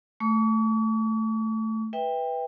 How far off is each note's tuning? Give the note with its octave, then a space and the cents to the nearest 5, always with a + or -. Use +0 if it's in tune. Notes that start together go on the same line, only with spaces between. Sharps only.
A3 +0 C#6 +45
B4 +0 E5 -15 G5 +20